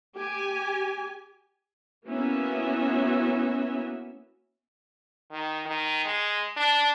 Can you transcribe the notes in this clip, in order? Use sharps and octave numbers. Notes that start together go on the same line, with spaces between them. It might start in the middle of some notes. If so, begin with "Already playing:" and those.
G4 G#5
A#3 B3 C#4 E4 F#4 E5
D#3
D#3
G#3
D4